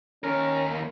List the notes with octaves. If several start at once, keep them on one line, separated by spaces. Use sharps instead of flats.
D#2 C#4 A#4